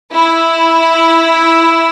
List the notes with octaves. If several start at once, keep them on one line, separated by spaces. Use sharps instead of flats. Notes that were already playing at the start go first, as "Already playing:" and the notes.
E4